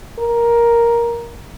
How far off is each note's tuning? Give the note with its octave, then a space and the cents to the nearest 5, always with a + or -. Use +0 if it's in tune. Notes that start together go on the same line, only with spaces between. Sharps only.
A#4 +10